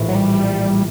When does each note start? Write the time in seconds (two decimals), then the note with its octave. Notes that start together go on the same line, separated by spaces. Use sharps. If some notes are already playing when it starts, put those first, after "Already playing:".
Already playing: A#1 A2 E3
0.08 F#3
0.15 G3